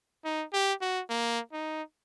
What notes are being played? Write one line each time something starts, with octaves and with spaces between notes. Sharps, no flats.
D#4
G4
F#4
A#3
D#4